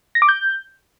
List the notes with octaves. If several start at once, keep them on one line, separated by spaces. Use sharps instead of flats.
A#6
D6
G6